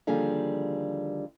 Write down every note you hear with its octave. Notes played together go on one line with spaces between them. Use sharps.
D#2 D3 F3 G3 G#4 F5